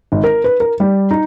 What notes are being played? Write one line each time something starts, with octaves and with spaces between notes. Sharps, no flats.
G#1
A#4
B4
A#4
G3
D#4